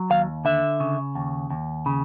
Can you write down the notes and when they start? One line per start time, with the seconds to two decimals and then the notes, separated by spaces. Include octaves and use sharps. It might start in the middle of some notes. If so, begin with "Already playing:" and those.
Already playing: F#3
0.10 D#2 F5
0.45 D3 E5
0.80 C#3
1.15 D#2
1.50 D#2
1.86 C#3